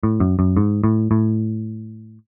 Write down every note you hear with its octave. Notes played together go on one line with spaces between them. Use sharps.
A2
F#2
F#2
G#2
A2
A2